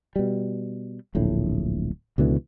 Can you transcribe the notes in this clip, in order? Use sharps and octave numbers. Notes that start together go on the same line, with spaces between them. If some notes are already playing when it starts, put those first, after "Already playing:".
B2 G3
D1 A#1 A2
C#2 B2 D3 E3